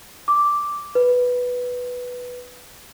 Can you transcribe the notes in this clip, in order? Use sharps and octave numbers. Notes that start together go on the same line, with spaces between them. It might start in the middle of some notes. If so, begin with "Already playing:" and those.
D6
B4